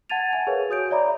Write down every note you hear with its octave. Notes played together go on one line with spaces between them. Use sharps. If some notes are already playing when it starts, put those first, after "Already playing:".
F#5 A5 G#6 A6 D#7 F7
E5 G#5
G#4 A#4 B4 C#5 F5 G#5
F#4 D#6 G6 D7
C#5 D5 E5 A#5 B5 D6